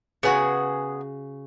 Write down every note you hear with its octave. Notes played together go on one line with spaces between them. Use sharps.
C#3 B3 F#4 G#4